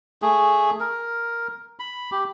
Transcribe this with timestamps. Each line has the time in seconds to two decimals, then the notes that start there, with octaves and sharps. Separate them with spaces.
0.22 A3 G#4
0.80 A#4
1.79 B5
2.12 G4